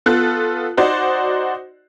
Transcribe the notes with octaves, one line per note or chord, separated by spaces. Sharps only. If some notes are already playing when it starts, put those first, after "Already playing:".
B3 F4 A4 F#6
D#4 F#4 C5 D5